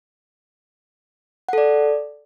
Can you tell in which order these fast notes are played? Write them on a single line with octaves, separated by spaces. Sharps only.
F#5 A4 D5